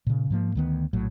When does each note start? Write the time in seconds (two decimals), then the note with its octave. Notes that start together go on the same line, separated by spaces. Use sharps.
0.07 A#2 C#3
0.30 G#2 F3 A#3
0.55 D2 D#3 B3
0.93 A#1 A2 F#3